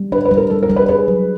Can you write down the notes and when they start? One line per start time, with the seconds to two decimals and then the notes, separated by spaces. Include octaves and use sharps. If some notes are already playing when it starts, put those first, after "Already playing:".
Already playing: G3
0.12 D4 B4
0.25 B4
0.31 G3
0.37 A#4
0.50 G3 A4
0.63 A#4
0.69 G3
0.76 B4
0.88 G#4 B4
1.08 F#3